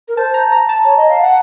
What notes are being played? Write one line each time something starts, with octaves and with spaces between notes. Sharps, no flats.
A#4
C5 A5
A#5
A#5
A5
C#5
D#5
F5
F#5